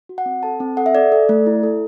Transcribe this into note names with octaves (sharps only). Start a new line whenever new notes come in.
F#4
F#5
C4
A4 A5
C4
A4 F#5
E5
A4 D5
A4
A3
E4
A4